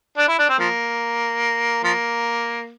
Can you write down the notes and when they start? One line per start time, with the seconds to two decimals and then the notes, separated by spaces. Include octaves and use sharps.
0.17 D4
0.28 E4
0.39 D4
0.49 C4
0.59 F3 A#3
1.84 F3 A#3